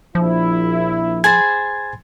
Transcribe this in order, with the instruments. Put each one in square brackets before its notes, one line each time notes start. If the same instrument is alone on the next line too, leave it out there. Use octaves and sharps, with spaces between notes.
[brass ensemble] A#1 E4 [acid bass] F3
[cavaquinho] G#4 C5 B5 [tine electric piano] G#6 A6